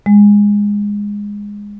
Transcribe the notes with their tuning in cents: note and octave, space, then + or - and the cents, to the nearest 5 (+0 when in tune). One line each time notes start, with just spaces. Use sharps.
G#3 -15